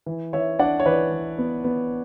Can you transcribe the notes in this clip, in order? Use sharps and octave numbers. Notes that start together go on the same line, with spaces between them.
E3
E3 C#5 E5
D4 D5 F#5
C#5
E3 B4 D5
E3
B3
B3